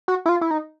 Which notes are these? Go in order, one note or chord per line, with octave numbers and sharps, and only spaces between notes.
F#4
E4
F4
E4
D#4